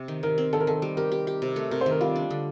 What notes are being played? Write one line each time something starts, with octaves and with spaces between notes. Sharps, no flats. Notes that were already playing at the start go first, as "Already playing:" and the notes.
Already playing: C3
D#3
D#3 A#4
C4
D#3 A4
A#4
D#3 A4
G3
G4 A#4
G4
G4
C3
A3
C3 A#4
C5
D#3 A#4
G3 F4
D4
D3